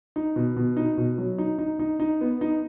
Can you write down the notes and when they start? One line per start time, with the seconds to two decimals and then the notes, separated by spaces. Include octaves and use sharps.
0.16 D#4
0.36 B2
0.56 B2
0.77 D#4
0.97 B2
1.18 F#3
1.38 D#4
1.59 D#4
1.79 D#4
2.00 D#4
2.21 B3
2.41 D#4